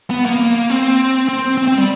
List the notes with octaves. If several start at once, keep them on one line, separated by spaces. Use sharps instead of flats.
B3
A#3
A#3
C4
C4
C4
C4
G3